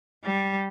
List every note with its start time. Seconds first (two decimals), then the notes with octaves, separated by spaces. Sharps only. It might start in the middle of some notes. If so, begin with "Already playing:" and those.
0.24 G3